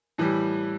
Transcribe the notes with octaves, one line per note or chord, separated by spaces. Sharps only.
A2 E3 G3